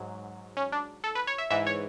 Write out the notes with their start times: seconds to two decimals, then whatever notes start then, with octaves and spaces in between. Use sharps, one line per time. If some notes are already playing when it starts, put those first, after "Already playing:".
Already playing: G#2 F#3
0.57 C#4
0.72 D4
1.04 A4
1.15 B4
1.27 C#5
1.38 E5
1.50 G#2 E3 E5
1.67 C#5